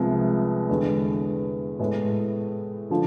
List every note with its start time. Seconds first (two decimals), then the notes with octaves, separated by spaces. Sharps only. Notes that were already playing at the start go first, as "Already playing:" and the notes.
Already playing: C2 C3 F3 G#3 B3
0.69 E2 D3 G#3
1.79 A2 G#3 B3
2.90 D3 F3